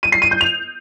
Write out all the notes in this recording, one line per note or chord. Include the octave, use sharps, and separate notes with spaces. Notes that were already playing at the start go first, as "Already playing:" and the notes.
D#7
C7
D#7
G6
F7